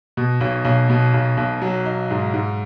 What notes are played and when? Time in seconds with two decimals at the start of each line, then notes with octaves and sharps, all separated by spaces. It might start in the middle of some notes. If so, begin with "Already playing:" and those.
0.17 B2
0.41 B1
0.65 B1
0.90 B2
1.14 B1
1.37 B1
1.62 F#3
1.85 D#4
2.11 G#2
2.34 G#2